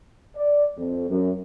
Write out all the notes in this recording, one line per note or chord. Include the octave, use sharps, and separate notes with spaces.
D5
F2
F#2